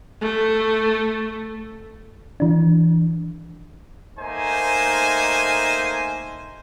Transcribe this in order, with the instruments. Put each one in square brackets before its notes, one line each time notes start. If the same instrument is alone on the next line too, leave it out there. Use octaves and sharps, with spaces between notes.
[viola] A3
[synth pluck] E3 D4
[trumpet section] A3 A#3 D#4 C5 G#5